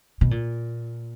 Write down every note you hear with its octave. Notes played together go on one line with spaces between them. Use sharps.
B2
A#2